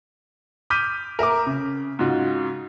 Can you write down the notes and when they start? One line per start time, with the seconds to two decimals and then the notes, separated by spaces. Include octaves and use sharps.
0.70 D6 F6 G6 B6 D#7
1.19 A#4 E5 A#5 D6
1.46 C#3
1.99 G#2 C#3 F4 F#4